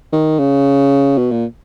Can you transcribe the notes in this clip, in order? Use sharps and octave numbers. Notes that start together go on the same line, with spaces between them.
D#3
C#3
B2
A#2